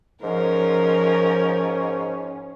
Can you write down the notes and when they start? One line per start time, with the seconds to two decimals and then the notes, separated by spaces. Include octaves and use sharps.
0.23 G#2 F3 C#4 A#4